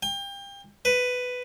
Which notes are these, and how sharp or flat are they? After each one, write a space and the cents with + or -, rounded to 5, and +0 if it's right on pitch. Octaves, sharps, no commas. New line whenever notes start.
G5 +30
B4 +10